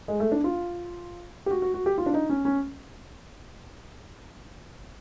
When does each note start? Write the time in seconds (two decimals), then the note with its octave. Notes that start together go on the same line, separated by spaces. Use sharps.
0.08 G#3
0.20 A3
0.32 D4
0.44 F4
1.46 G4
1.51 F#4
1.62 F#4
1.74 F#4
1.86 G4
1.98 F4
2.06 D4
2.14 D#4
2.29 C#4
2.45 C#4